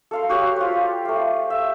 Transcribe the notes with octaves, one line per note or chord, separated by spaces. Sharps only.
A4 F5 C6
F#4 G4 C#5 F5
F4 C5
A3 F5
E5